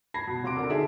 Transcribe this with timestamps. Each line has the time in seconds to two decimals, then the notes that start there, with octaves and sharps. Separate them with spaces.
0.14 A5 B5 G#6 A#6 C7
0.27 B2
0.43 D#1 C3 F#4 C6 D6 D7
0.57 D3 A4 A#4
0.70 D#4 G#4 A4 E5